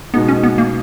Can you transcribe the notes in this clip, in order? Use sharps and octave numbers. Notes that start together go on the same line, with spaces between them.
B2 G#3 B3 D#4
C#4
B3
A#3